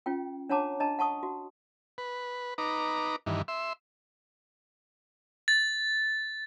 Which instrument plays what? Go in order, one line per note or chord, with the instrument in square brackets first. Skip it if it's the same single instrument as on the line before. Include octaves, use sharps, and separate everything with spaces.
[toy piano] C#4 F4 G5
D4 C#5 F#5 A5 A#5 D6
D4 D#5 A5 A#5
F#5 A5 C#6 D#6
F#4
[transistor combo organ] B4
D#4 B4 A#5 D6
G2 D#3 E3
E5 C6
[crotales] A6